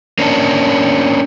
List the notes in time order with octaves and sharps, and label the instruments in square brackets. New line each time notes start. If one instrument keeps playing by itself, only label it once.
[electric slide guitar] A#3 C#4 D4